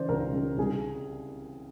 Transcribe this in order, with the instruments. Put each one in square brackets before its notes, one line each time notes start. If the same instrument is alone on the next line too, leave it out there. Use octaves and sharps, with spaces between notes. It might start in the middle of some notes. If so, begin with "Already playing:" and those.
Already playing: [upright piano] C#3 E3 C5 D5
C#2 A#4
C#3
C2 G#4